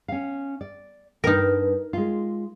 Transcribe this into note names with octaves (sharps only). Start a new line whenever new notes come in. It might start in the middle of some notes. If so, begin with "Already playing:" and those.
C#4 F5
D5
G2 D4 D#4 A#4 B4
G#3 F4